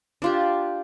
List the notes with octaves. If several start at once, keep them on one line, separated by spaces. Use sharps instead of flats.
D4 F4 G4